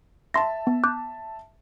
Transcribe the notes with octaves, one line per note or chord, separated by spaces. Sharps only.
E5 A5 C6 A#6
B3
D6 F#6 G6